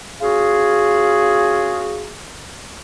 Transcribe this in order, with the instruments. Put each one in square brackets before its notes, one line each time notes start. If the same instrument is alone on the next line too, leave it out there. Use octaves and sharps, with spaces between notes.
[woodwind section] C#4 F4 F#4 G#4